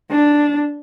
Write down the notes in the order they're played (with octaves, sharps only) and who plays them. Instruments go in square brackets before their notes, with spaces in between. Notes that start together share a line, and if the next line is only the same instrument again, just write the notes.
[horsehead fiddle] D4